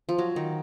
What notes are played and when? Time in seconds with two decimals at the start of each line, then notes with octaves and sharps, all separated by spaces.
0.09 F3
0.18 F#3
0.36 D#3